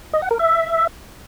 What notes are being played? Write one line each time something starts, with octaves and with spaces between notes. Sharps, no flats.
D#5
F#5
A#4
E5